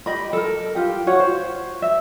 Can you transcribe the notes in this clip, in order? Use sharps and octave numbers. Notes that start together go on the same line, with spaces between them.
G4 D#5 B5
A4 A#4
F4 G4 G5
F4 F#4 C#5 F#5
C5
E5